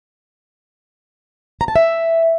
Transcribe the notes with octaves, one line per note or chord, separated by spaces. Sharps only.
A#5
A5
E5